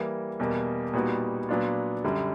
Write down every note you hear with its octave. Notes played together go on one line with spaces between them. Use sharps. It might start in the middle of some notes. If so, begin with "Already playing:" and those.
Already playing: E3 G3 A#3
E2 B2 G3 A#3
A#2 G3 B3 D#4 F#4
A#2 F#3 B3 D4 F4
F#2 D3 G3